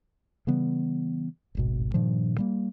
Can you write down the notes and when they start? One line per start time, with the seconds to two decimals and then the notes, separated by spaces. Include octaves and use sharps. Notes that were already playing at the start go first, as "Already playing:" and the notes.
0.47 C#3 E3 G3 B3
1.55 D1 G#1 B2
1.94 G2 A#2 D#3 F3
2.38 G3 A#3